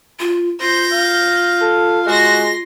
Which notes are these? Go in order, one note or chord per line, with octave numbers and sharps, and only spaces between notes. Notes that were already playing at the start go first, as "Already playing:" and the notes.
F4
F4 C5 G6 A#6
F5
A4
G#3 F#4 C6 A#6